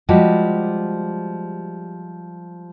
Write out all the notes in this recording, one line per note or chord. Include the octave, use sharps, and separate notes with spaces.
F3 G3 G#3 F#4 G4